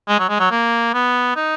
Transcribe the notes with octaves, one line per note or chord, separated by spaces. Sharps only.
G#3
F#3
G#3
F#3
A#3
B3
D#4